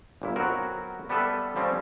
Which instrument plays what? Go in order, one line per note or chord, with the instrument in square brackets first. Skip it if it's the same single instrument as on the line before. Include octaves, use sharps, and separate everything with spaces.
[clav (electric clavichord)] G1 A#2 E4
F#3 B3 C4 F#4 A#4 F#5
G3 B3 G4 A4 B4 E5
F3 G3 C4 C#4